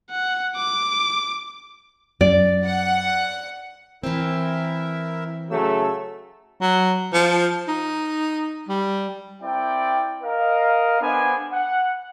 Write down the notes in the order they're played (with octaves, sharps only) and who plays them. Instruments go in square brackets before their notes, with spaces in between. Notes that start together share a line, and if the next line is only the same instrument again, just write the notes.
[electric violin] F#5
D6
[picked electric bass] F#2 [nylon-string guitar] D5
[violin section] F#5
[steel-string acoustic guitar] E3 C4 [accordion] E4 A#4 E5
[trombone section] C#3 F#3 A3 [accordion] E6
[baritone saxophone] F#3
F3
D#4
G3
[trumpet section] C4 E4 A#4 D5 G5
A#4 D#5 F5
B3 D4 G#4 C5 G#5 B5
F#5